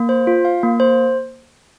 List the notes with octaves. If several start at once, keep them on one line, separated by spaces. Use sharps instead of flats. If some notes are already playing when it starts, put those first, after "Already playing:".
Already playing: A#3
C5
F4
F5
A#3
C5